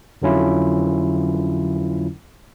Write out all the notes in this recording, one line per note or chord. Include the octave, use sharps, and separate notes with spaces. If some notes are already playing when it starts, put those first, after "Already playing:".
F2 D3 F#3 C#4 E4 F4